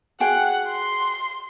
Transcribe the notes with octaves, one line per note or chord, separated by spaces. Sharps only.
F#4 G#4 F#5 G5
C6